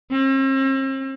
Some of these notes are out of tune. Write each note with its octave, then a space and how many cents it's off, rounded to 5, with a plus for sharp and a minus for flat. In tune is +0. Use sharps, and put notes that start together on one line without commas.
C4 +45